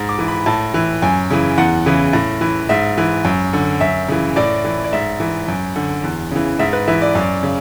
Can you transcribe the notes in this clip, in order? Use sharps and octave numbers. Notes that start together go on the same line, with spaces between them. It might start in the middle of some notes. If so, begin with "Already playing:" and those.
Already playing: G#2
D6
E3
B5
A2 A5
E3
F#2 G#5
C#3 E3
E2 F#5
C#3 E3
A2
E3
G#2 E5
E3
F#2
D3
F#2 E5
C#3 E3
A2 D5
E3
D5
G#2 E5
E3
F#2
D3
E2
C#3 E3
G#2 E5
B4
E3 E5
D5
F#2 D5
C#3